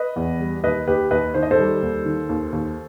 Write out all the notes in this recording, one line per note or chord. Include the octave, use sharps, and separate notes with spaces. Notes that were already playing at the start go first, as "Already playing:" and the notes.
Already playing: B4 D#5
E2
G3
D#2 B4 D#5
D#2 G4 B4
D#2 B4 D#5
D#3 C5
D#5
A4 C5
G3
D#2
D#3
D#2
D#2